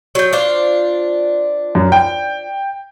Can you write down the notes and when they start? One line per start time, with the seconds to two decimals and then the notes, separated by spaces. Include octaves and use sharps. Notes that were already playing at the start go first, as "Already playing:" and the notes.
0.15 F#3 G5
0.33 D4 F4 C5
1.75 F#2
1.92 G5